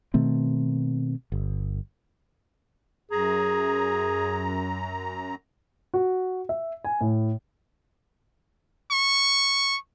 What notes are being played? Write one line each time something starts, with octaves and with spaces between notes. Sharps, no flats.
B2 D#3 A3 C4
G1
F#2 G#4 A#5
F#4
E5
G#5
A2
C#6